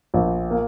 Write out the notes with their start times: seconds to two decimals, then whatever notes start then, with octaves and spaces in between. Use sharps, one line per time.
0.14 A#1
0.50 A#3